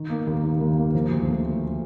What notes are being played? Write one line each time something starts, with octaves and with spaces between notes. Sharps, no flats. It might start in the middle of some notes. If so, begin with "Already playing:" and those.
Already playing: D#3
A#3
D#2
D#3
D#2
A#3
F3
D2
A3
A3